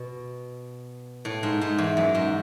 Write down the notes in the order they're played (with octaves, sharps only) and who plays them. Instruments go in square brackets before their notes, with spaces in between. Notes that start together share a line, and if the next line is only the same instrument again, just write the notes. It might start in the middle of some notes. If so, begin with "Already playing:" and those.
Already playing: [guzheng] B2
A2
G#2
G#2
E2
F#2
G#2